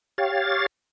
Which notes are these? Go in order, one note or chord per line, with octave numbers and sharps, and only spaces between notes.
G4 C#5 F5 A6